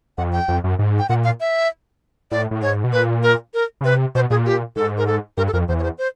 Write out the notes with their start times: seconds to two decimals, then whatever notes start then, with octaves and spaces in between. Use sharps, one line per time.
0.18 F2 F#5
0.33 G5
0.48 F2
0.64 F#2
0.79 G#2
0.99 G5
1.09 A#2 F#5
1.24 F5
1.40 E5
2.32 A2 D5
2.51 A2
2.62 G#2 C#5
2.84 B2
2.93 A#2 B4
3.23 A#4
3.54 A#4
3.81 C#3
3.84 C3 B4
4.15 B2 C5
4.30 A#2 G#4
4.46 G4
4.76 G#2 A4
4.98 A#4
5.07 A4
5.37 G2 A#4
5.48 A4
5.53 F2 A#4
5.68 E2 C5
5.79 C#5
5.83 C5
5.98 C5